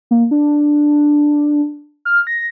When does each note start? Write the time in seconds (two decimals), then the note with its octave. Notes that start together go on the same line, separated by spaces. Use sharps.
0.11 A#3
0.31 D4
2.05 F6
2.27 A#6